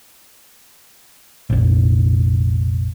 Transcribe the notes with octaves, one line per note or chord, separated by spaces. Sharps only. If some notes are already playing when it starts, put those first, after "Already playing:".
F1 A#1